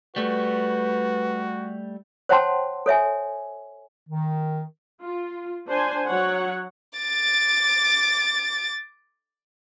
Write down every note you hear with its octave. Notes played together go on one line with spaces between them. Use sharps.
G3 A3 F#4 B4
C5 C#5 F#5 G5 A5 C6
A4 C#5 E5 G#5
D#3
F4
D4 C5 G#5
F#3 C#5 F#5
D6 A6